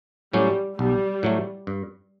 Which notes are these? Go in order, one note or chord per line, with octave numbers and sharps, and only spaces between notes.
A2 F#3 G3 C#4
B1 G3
A2 F#3 A3
G2